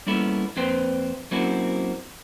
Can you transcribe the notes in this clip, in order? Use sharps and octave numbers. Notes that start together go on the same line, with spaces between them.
G3 A#3 B3 C#4 E4 A4
F2 A#3 C4 B4 C5 G5
F#3 A#3 C4 C#4 E4 F#4